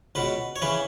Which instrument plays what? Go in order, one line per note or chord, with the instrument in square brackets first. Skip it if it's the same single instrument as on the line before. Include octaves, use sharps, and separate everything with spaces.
[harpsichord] C#2 B2 B4
C#5
C#3 E3 B4